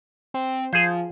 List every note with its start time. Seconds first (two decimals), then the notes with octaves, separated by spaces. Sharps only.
0.34 C4
0.73 F3 G#4 C5